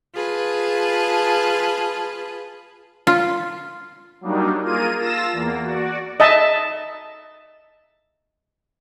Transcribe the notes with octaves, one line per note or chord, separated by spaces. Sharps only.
F4 G#4 B4 A5
F4
F#3 G3 A#3 D4 D#4
A#3 F4 G#4 A#4 D#7
F4 A5 E6 A#6 E7
E2 A#3
F#4 D5
D#5 E5 A5